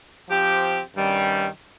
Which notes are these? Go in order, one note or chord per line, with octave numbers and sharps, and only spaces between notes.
F3 C4 G4
G2 D#3 G3 C#4